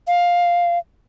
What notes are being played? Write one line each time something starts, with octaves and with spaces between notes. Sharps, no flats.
F5